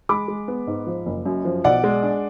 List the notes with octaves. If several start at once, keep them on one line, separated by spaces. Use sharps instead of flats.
G#3 B5 D6
G#3
B3
G#2
F3
F#1
F#2
F3
B1 D5 F#5
G#3
D4